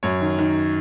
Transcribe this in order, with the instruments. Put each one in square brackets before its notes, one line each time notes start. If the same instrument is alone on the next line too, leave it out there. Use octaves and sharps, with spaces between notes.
[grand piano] F#2 C#5
D#3
D#3